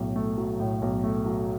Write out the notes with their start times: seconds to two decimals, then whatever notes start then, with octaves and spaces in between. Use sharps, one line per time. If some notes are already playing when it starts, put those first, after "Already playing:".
Already playing: B1 A2
0.16 A3
0.38 F#3
0.60 A2
0.82 B1
1.04 A3
1.26 F#3